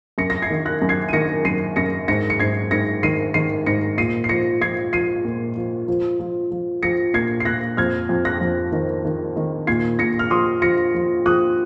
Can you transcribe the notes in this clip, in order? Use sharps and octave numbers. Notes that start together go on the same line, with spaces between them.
F#2 A#6 C#7
A#6
G#6 C7
D#3
F#6 A#6
F#2
G#6 C7
D#7
D#3 A#6 C#7
F#2 C7 D#7
F#2 A#6 C#7
G#2 A#6 C#7
C#7
G#2 G#6 C7
G#2 A#6 C#7
D#3 C7 D#7
D#3 C7 D#7
G#2 A#6 C#7
A#2 C7 D#7
C7
F3 A#6 C#7
F3 G#6 C7
F3 C7 D#7
A#2
F3
F3
F3
F3
F3 A#6 C#7
A#2 G#6 C7
C7
A#2 F#6 A#6
F2 F6 G#6
F2
F#6 A#6
F2
D#3
D#3
D#3
A#2 G#6 C7
A#2 A#6 C#7
F6
F3 C6 D#6
F3 A#6 C#7
F3
F3 D#6 F#6